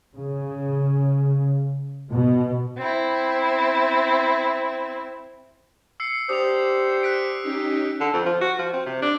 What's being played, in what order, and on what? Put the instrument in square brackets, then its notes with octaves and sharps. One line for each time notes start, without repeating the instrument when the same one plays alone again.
[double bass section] C#3
B2
[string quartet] C4 E4
[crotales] E6 C7 C#7
[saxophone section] D4 G4 C5 [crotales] D#6 F7
[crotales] F#6 B6 D7
[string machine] C#4 D#4 G4
[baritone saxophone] D3
F2
F3
F#4
F3
C4
C3
D4